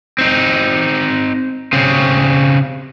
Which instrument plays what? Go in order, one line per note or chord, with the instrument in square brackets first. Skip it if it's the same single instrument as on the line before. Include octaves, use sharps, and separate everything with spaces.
[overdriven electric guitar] C4 D#4
C#3 C4